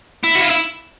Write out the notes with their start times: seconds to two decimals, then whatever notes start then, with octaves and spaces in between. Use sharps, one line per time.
0.24 E4
0.35 F#4
0.42 F4
0.50 E4